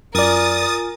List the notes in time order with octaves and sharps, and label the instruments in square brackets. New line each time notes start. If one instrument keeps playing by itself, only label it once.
[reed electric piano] F#2 D5 [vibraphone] F4 G#5 [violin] A#4 [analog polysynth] D#6 A6